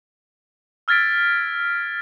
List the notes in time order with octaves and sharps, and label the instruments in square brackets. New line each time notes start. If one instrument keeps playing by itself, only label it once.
[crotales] E6 F6 G#6 A6 B6 D7